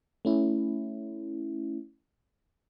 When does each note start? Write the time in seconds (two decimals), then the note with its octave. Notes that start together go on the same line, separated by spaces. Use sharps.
0.25 A3 C#4 E4